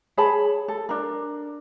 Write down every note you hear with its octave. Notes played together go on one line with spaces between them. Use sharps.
G#4 C#5 A5 B5
A4
D4 A#4